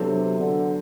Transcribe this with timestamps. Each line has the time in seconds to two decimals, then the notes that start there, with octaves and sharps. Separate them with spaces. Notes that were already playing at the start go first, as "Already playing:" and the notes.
Already playing: C3 F#3 B3 D4 A4 C5
0.39 D3